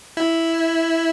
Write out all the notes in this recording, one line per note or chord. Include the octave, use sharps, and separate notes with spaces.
E4